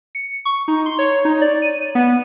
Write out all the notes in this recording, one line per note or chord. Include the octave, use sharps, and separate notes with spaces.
C#7
C#6
D#4
C6
C#5
D#4
D5
D#7
B3